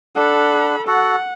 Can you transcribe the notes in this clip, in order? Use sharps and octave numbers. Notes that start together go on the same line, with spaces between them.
D4 A4 F#5 B5
F#4 A4 F#5